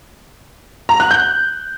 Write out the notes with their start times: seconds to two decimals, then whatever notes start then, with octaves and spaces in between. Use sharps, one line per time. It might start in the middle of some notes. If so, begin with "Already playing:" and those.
0.89 A#5
1.00 F#6
1.11 G6